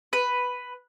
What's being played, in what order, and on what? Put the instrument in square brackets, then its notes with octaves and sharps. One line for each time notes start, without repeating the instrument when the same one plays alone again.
[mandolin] B4